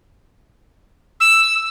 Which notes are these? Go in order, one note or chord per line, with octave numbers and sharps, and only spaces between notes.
E6